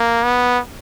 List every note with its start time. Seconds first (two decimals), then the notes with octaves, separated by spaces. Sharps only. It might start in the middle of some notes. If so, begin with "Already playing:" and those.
Already playing: A#3
0.24 B3